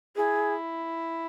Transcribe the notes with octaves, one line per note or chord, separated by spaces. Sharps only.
E4 G#4